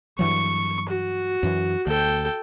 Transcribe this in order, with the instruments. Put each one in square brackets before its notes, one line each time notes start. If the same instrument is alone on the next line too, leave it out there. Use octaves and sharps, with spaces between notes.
[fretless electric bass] G2 E3 F#3 [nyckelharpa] C#6
[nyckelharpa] F#4
[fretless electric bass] F#2 E3
[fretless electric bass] D2 [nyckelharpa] A4 G5